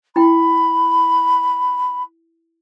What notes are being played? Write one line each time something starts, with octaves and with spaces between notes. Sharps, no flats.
E4 G5 B5